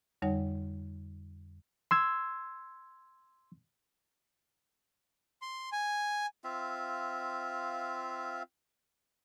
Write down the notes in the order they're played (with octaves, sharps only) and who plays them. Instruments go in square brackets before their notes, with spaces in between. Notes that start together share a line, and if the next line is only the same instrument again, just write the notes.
[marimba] F2 D3 G3 D#4 C#5 F#5
[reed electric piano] C6 E6 G#6
[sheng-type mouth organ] C6
G#5
[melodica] C4 F4 E5 F5